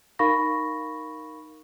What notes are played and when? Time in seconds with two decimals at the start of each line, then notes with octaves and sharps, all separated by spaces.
0.19 D#4 A#4 F5 B5 C#6 A#6